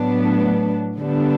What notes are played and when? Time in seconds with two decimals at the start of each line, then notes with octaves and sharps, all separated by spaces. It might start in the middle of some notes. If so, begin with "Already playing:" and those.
Already playing: A2 F#3 B3 D4
0.98 D3 G3 B3 D4